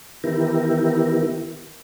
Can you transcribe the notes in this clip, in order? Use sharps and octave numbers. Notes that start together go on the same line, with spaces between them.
D#3 E3 B3 E4 G4 A#4